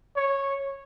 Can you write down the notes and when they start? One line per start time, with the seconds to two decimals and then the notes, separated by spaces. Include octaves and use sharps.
0.16 C#5